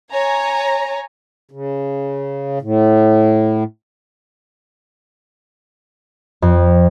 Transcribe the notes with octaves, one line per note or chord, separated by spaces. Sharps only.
C#5 G#5 A#5
C#3
A2
F2